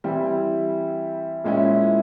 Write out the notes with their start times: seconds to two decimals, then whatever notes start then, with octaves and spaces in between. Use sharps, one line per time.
0.04 E3 G3 C4 E4
1.44 A#2 G#3 C#4 E4